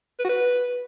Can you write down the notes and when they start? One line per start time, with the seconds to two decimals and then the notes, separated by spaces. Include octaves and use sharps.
0.19 B4
0.24 F#4
0.29 B4